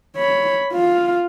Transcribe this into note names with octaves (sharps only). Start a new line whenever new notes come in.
C#5 B5
F4 F5